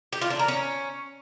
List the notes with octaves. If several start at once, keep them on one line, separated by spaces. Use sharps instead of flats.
G4
F4
D4
A#4
C#4